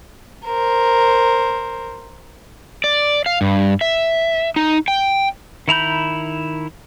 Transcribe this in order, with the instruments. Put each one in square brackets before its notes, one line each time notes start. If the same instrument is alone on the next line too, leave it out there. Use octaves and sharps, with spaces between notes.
[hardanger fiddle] A#4 C5
[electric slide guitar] D5
F5
G2
E5
D#4
G5
[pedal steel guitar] D#3 E4 A#5 B5 G6